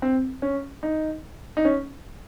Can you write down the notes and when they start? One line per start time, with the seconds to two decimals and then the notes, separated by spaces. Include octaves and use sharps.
0.02 C4
0.42 C#4
0.83 D#4
1.57 D#4
1.65 C#4